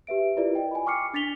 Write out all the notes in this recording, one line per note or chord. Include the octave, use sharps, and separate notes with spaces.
G4 B4 E5 D7
E4 F4 G4 A#4 B4 D5
D#5 G5
G#5 B5
G5 C#6 D6 F6 C7 C#7
D4 A6 B6 F7 G7